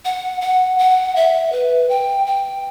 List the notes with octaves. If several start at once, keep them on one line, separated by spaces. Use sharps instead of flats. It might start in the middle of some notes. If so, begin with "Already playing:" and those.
F#5
F#5
F#5
E5
B4
G5
G5